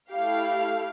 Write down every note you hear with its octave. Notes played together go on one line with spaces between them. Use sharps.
A3 E4 G4 F5